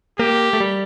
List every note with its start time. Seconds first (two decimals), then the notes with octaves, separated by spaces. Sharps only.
0.19 A#3 G4
0.53 A3
0.60 G3